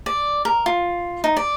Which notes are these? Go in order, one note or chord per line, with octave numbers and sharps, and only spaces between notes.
D5
A#4
F4
D#4
D5